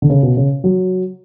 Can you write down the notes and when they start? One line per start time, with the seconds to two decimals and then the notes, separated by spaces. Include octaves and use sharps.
0.02 D3
0.10 C#3
0.23 B2
0.37 C#3
0.64 F#3